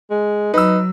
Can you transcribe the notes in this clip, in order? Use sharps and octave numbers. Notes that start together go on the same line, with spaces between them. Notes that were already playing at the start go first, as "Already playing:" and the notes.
G#3
F#3 D#4 B4 E6